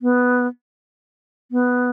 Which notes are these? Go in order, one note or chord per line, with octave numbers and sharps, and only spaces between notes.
B3
B3